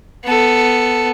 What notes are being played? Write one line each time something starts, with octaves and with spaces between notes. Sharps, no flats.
B3 A4